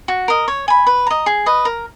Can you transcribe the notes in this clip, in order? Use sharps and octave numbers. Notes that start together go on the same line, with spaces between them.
F#4
A#4 D#5
C#5
G#5 B5
B4
D#5 A#5
G#4
B4 D#5
A#4